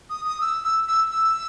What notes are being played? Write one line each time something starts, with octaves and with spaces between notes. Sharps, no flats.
D#6
D#6
E6
E6
E6
E6